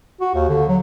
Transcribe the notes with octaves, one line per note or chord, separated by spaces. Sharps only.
F#4
D#2
D3
F#3